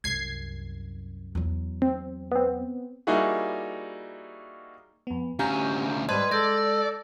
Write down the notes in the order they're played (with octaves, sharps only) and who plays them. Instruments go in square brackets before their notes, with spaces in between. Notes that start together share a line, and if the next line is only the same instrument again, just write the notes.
[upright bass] C2 F#2 [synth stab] G#6 C7
[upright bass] E2 F#3
[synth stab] C4
B3 C4
[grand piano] G3 A#3 D#4 E4 F#4 G#4
[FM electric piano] F2 B3
[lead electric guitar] D2 C#4 [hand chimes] G4 [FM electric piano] F5 A#5 G6
[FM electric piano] G#2 C5 A5 [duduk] G3 [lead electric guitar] B4 [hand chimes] D#5 C6 G#6
[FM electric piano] G#3 [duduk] A4 [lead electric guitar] D5 [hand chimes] G6 A#6